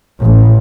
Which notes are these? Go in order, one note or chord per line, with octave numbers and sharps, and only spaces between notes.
A1